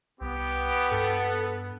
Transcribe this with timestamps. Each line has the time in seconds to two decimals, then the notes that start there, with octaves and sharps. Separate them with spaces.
0.21 C2 B3 G4
0.91 G2 A4 F#5